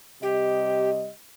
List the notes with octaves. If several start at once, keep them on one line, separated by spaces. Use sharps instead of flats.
C3 G3 G4 D#5